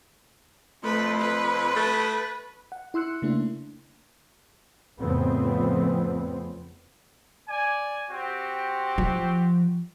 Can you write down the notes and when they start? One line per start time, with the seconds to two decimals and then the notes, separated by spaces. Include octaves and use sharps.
0.83 F2 A3 B4
1.19 B4
1.76 A3
2.72 F#5
2.94 E4 C6 E6 F#6 C#7
3.22 C#3 A3 A#3 D4 E4
4.99 F2 A2 C#3 B3 C4
7.48 D5 G#5
8.10 C4 F#4 G4
8.98 F3